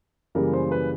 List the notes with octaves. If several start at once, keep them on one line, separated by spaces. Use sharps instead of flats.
F#2 C#3 E3 G3 A#3 A#4
C5
B4